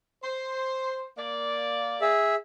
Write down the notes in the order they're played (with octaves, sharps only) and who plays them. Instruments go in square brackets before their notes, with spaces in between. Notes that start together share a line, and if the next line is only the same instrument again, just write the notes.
[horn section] C5
A#3 D5
[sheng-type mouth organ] G#4 E5